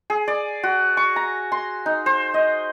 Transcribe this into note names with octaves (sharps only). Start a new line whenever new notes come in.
G#4
D5
F#4
C#6
A#5
C6
D#4
C5
D#5